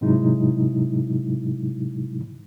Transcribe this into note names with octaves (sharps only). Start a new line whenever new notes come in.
G#2 C3 F#3 G#3 D#4 E4